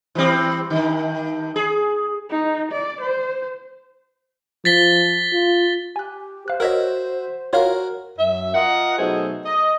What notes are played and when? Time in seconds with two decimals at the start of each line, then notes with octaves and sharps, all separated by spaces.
0.15 E3 G3 C4
0.70 G2 D#3
1.56 G#4
2.30 D#4
2.72 D5
3.01 C5
4.65 F3 A6 B6 G7
5.33 F4
5.96 G4 G#5 F#6
6.48 C5 F5 F#6
6.60 F#4 A#4 C#5 D#5 E5
7.53 F4 F#4 A#4 C#5 F5
8.19 F#2 E5
8.55 F4 A#4 D#5 F#5
8.99 B2 F#3 A3 D#4 G#4 C5
9.46 D#5